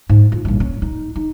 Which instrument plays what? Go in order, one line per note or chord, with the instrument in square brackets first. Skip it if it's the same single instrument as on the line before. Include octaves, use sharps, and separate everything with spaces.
[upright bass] G#2
F4
A#1 G2
C#4
D#4
D#4